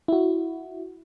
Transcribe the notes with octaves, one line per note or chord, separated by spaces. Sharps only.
E4 F#4